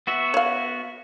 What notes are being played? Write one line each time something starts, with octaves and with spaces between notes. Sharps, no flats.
B3 F#4 E5
C#5 F5